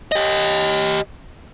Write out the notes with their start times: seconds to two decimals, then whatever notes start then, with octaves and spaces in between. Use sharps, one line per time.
0.12 G4 D#5